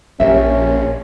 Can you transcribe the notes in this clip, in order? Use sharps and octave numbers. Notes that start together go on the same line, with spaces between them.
A#1 C#4 G4 A#4 E5